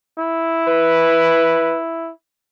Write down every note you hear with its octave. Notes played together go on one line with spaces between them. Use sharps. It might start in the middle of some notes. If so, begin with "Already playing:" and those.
E4
B4